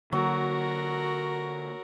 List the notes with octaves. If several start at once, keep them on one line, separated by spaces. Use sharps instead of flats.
D3 F#3 A#3 F#4 A#4